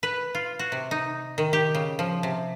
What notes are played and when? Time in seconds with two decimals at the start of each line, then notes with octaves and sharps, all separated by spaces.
0.03 B4
0.35 F4
0.59 F#4
0.72 C3
0.91 D#4
1.38 D#3
1.53 G4
1.75 C#3
1.99 F3
2.23 C3